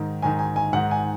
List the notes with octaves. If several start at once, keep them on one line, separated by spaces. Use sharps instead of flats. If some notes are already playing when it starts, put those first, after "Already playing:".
Already playing: G#2 D#3
G#2 D#3 G#5
G#5
G#5
G#2 D#3 F#5
G#5